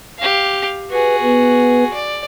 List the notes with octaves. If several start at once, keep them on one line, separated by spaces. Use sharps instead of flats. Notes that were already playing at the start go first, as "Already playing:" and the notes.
G4 F5
F#4 G#4 B4
B3 B4
D5